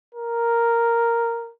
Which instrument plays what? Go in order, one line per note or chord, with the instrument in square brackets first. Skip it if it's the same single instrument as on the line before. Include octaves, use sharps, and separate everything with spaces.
[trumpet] A#4